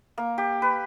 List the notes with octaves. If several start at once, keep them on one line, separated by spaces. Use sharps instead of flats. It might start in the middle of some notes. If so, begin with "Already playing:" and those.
A#3
G4
B4